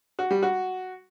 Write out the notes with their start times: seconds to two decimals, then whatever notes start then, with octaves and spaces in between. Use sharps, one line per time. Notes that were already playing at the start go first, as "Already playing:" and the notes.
0.19 F#4
0.31 G3
0.43 F#4